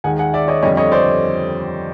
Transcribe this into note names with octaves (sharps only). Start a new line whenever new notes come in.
D#2 D#3 G#3 F#5 G#5
F#5 G#5
D5 E5
C#5 D#5
F2 D3 G3 C#5 D#5
C#5 D#5
C5 D5